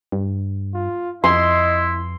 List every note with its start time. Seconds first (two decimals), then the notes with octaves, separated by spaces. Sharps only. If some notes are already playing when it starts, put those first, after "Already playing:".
0.12 G2
0.74 F4
1.24 F2 E4 D#5 C6